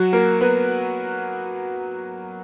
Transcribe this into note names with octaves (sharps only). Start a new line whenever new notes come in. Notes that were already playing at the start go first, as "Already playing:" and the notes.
Already playing: F#3 F#4
A#3 A#4
B3 B4